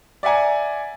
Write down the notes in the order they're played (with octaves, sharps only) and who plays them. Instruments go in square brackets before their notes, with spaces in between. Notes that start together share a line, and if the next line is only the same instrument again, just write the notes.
[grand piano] D5 E5 F#5 G#5 A#5